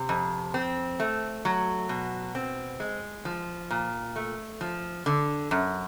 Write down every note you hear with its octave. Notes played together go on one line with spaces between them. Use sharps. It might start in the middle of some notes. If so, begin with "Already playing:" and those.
Already playing: C3
F2
C4
A3
F#3
B2
C4
G#3
F3
A#2
A3
F3
D3
F#2